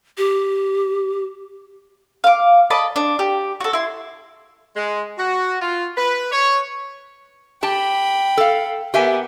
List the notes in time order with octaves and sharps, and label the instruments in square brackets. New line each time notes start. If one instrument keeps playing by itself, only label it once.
[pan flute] G4
[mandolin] F5 D6
D5 D#5 A5 B5
D4
G4
F#4 A4
E4 C6
[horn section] G#3
F#4
F4
B4
C#5
[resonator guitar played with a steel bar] G4 A5 [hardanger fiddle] G5 B5
[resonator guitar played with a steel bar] A4 F5
[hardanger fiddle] B3 A#4 [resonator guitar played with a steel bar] G4 E5 G#5